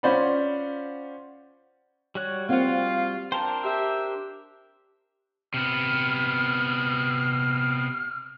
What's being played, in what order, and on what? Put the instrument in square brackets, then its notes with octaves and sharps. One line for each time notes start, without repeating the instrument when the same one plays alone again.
[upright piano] C#4 F4 C5 D5 F#5 B5
[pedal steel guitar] G3 F#4 F#6 [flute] C#5
[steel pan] A#3 C4 F#5 [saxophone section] F4 [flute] F5
[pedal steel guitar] D4 A#4 C5 [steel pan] G5 [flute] A5
[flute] G4 [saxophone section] E5
[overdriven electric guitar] C3 B3 [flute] F6